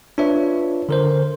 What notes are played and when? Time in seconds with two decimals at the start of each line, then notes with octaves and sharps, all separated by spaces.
0.18 D4 F4 B4 C#5 E5
0.89 D3 A#4 C5